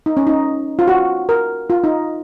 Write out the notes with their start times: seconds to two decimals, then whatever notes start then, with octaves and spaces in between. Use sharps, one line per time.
0.06 D#4
0.17 C#4
0.27 D#4
0.79 F4
0.88 F#4
1.29 A#4
1.70 F4
1.84 D#4